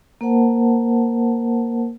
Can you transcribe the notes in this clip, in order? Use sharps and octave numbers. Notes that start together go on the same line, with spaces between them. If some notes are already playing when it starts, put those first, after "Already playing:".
A#3 A#4 C5 F#5 A5